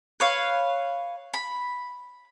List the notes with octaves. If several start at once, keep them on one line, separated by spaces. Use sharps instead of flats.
B4 C#5 F5
B5